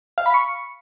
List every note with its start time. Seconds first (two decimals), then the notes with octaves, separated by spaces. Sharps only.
0.18 F5
0.26 B5
0.34 C#6